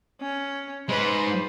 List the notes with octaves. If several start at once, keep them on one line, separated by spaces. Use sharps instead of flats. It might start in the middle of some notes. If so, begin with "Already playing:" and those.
C#4
G#3 D#4 B4 C5